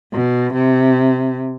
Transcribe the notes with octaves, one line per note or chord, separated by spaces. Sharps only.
B2
C3